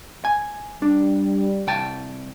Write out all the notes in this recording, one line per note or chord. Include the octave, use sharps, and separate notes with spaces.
G#5
G3 D4
C2 G5 A5